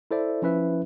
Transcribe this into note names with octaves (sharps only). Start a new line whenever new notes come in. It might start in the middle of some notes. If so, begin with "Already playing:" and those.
E4 A4 C5 D5 E5
F3 C#4 E4 B4 E5